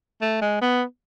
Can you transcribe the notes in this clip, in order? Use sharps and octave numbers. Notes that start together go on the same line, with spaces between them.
A3
G#3
B3